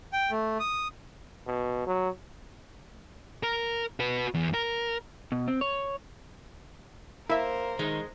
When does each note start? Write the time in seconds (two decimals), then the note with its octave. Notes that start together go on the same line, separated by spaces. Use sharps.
0.13 G5
0.31 A3
0.60 D#6
1.46 B2
1.87 F#3
3.43 A#4
4.00 F#4 B4
4.34 E2
4.54 A#4
5.32 B2
5.48 C4
5.61 C#5
7.29 A#3 E4 A#4 C5 E5
7.79 D#3 G#3 D#4